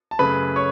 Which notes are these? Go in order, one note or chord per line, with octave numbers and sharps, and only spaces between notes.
A5
F#2 C#3 A3 B4 B5
C#5 C#6